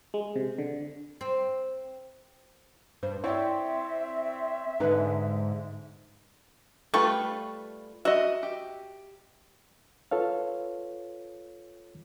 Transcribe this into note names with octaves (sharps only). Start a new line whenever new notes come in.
G#3
C3
D3
C4
G2 C5
C4 E4 C#5 D5 E5 G5
G#2 D3 G#3 D#4 B4
G3 A3 F4 A4 B4 C#6
F#4 D#5 E5
G4
F4 A4 B4 C#5 F5